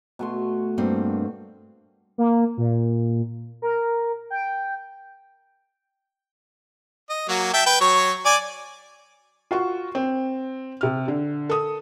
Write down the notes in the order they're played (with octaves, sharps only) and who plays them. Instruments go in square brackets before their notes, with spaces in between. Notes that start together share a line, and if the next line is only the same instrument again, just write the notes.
[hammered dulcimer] B2 A3 C6
[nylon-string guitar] G2 A#3 C4
[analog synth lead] A#3
A#2
A#4
G5
[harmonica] D#5
F#3 A#3 F#4
E5 G5 A5
B4 G5
F#3 C#5 C#6
D5 G#5 D6
[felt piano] F4 F#4 C#6
C4
C3 F6
D3
A4 D#6